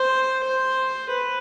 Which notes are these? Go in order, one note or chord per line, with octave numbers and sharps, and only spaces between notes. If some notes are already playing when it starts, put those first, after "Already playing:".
Already playing: C5
C5
B4